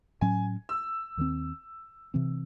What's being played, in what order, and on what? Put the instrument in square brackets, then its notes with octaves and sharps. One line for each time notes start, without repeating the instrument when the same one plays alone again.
[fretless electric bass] A2 F#3 C#4 [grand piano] G#5
[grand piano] E6
[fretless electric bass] D#2 D#3 F#3 C4
C3 E3 C4